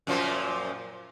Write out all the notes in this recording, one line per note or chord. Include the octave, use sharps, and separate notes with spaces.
F#2 A#2 F3